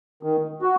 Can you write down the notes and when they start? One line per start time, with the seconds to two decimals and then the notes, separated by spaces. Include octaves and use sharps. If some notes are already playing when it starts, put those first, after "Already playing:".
0.23 D#3
0.62 F#4